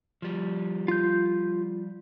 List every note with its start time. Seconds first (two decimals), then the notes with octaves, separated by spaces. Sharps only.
0.22 F3 G3
0.88 F4 G6